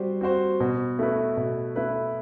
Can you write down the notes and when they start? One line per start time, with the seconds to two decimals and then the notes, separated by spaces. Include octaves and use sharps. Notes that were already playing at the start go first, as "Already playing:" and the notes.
Already playing: G3 C4 F#4 C5
0.21 C4 F#4 C5
0.60 B2
0.99 A3 E4 B4
1.37 B2
1.76 A3 E4 B4